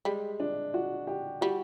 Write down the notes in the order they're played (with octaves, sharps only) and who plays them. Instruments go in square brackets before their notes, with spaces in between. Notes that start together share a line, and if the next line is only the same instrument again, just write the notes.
[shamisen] G3 [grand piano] G#3
[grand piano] D4
F#4
G4
[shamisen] G3 [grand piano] F#4